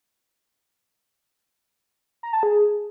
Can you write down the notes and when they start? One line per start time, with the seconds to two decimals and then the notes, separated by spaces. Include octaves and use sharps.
2.23 A#5
2.33 A5
2.43 G#4